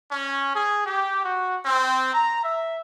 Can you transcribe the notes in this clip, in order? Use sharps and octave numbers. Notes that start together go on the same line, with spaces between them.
C#4
G#4
G4
F#4
C4
A#5
E5